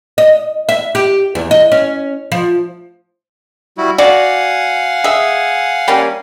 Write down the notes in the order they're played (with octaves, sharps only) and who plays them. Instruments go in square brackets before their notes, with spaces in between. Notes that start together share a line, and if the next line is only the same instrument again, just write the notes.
[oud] D#5
E5
G4
E2
D#5
C#4
F3
[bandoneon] G3 E4 F#4
[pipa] F#4 D5 [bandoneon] F5 F#5 G#5
[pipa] G#4 E5
G3 A#3 C#4